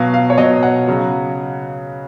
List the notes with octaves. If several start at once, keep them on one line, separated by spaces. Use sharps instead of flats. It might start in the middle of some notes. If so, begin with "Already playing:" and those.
Already playing: B2 F#3 F5
F5
C#5
B2 F#3 D#5
F#5
C#3 F#3